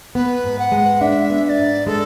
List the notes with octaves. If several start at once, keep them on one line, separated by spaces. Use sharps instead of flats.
B3 B4
G#2
F#5
G#3
D4 E5
B3
E5
D5
G#2
G#3 A4